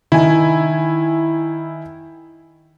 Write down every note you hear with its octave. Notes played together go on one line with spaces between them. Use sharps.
D#3 E4 G#5